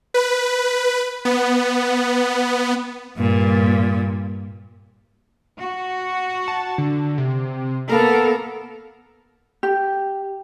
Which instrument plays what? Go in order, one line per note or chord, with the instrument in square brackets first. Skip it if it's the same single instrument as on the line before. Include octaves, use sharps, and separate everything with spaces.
[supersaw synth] B4
B3
[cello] G2 A#2
[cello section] F#4
[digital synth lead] A5
D3
C3
[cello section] A#3 B3 A#4 [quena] A4 [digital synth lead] F5
[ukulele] G4